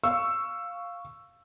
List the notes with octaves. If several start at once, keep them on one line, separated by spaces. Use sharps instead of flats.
F5 C#6 E6